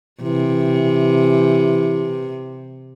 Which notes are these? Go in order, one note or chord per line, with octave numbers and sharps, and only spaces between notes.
C3 E3